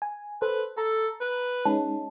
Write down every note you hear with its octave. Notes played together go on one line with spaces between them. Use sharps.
G#5
A4 B4 C5
A4 A#5
B4
G#3 C#4 D#4 A5